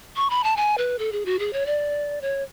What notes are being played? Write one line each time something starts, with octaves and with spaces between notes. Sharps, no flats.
C#6
B5
A5
G#5
B4
A4
G#4
F#4
G#4
C#5
D5
C#5